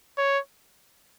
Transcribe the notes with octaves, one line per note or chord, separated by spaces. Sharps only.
C#5